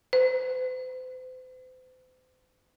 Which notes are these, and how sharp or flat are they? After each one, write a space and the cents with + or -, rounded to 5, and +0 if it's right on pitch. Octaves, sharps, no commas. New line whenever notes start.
C5 -40